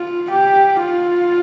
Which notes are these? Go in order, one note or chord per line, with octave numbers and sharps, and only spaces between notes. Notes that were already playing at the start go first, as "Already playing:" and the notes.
Already playing: F4
G4
F4